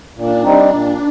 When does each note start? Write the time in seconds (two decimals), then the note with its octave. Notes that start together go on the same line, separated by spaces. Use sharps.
0.16 A#2 D4
0.44 G3 C4 D#4
0.71 A#2